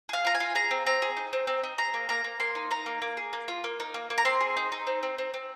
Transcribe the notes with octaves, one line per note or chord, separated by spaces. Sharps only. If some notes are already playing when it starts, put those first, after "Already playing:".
G#4 F5
F4 A#5
G#5
F4
G#4 A#5
C4
C4 A#5
G#4
D#4
C4
C4
D#4
G#4 A#5
A#3
A#3 A#5
A#3
A#3 C6
D#4
D#4 A#5
A#3
A#3
G#4
A#3
F4
A#3
D#4
A#3
A#3
A#5
C4 C6
G#4
D#4
D#4
C4
C4
C4
C4